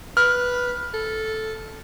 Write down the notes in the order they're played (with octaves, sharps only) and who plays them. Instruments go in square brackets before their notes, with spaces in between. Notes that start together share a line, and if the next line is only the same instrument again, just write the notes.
[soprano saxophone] B4 [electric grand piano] F6
[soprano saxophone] A4